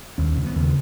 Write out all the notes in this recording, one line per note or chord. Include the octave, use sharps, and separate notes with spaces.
D#2 C#4
C#3
B3
D#2